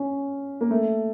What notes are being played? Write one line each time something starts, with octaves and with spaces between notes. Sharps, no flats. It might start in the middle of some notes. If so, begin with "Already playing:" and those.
Already playing: C#4
A#3
A3